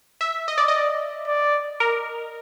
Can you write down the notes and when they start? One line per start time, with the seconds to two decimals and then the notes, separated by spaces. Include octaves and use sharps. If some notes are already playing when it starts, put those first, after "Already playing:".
0.21 E5
0.48 D#5
0.58 D5
0.68 D#5
0.74 D5
1.27 D5
1.80 A#4